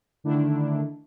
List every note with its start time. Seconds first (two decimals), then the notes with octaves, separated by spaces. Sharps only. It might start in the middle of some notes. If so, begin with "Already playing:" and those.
0.24 D3 D#3 A3 D4 E4